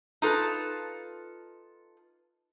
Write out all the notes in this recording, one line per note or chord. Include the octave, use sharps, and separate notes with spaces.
D#4 F4 A4 B4